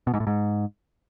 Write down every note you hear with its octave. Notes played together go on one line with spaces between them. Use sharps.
B2
G#2
A2
G#2